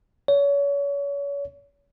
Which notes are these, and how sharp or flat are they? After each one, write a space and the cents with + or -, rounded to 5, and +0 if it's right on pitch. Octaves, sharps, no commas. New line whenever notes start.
C#5 +35